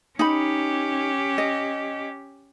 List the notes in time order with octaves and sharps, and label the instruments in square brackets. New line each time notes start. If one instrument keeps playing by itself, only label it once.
[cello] C#4 G4 [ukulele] D#4 B5
[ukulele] D#5